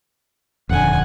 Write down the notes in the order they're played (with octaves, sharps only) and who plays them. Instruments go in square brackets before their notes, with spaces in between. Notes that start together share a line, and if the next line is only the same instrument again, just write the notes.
[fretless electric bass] D#1 F2 D3 [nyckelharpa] F#5 G#5